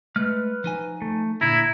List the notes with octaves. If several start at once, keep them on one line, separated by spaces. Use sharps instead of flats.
G#3 A3 B4 F6
F3 D#4 G#5
A3
A#2 D3 E4 A#5